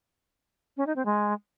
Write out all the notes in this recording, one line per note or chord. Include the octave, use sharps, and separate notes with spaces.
C#4
D#4
C4
G#3